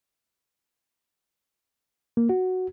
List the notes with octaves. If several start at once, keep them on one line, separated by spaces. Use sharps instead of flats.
A#3
F#4